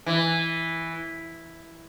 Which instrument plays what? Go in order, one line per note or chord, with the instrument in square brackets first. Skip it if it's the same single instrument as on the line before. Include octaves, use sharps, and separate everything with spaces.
[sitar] E3